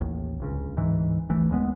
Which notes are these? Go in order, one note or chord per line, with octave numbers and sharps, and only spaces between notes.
A1 D#2
D1 C#2 C#3
D1 G#2 E3
D1 G#1 E3 A3
D#1 D#2 G#3 B3